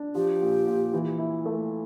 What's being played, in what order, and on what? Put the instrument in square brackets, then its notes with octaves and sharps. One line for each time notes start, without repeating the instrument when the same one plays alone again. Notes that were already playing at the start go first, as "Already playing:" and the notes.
Already playing: [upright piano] D4
[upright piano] F3 [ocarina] G4
[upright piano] A#2
A#2
E3
E4
A3